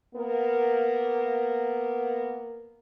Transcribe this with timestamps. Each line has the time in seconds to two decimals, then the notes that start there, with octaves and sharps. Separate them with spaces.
0.14 A#3 B3 A#4